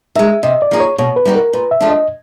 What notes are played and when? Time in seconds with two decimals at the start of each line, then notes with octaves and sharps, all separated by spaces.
0.15 D#3 G#3 E5
0.43 C3 D#5
0.62 D5
0.71 F3 A#3 D#4 G#4
0.80 C#5
0.98 B2 C#5
1.16 B4
1.25 G3 C4 D#4 F#4
1.35 A#4
1.53 A#2 B4
1.71 E5
1.81 F3 A3 D4 F4
1.90 D#5